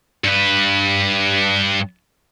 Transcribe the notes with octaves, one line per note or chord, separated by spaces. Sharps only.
G2 B4